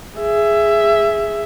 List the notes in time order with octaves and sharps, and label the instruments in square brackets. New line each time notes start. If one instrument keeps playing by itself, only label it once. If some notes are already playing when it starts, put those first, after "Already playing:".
[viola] G#4 E5